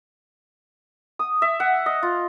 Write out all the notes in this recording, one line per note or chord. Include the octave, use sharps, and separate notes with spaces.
D#6
E5
F#5
D#5
F4